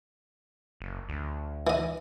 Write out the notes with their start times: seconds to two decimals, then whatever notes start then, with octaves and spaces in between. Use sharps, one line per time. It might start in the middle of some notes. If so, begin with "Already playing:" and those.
0.80 F#1
1.09 D2
1.67 E3 D#5